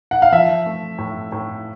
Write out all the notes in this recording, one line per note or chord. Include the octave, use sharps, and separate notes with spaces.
F#5
F5
F3 E5
A3
A2
A2